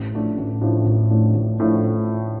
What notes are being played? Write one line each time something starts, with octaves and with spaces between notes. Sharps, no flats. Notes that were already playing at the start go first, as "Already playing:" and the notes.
Already playing: A1
A2 F3 A3 D4
A1
A2 F3 A3 D4
A1
A2 F3 A3 D4
A1
A2 F3 A3 D4